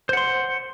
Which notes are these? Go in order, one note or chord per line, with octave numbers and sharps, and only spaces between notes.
C5 F#5 C6